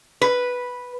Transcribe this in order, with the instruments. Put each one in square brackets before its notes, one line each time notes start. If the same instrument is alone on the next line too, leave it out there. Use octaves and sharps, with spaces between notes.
[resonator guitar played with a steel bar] B4